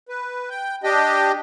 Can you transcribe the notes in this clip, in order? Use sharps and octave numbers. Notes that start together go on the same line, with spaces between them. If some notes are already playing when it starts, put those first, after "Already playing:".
B4
G5
D4 G4 D#5 G5